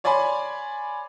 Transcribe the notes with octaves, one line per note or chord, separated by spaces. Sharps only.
C#5 D5 G#5 B5 C6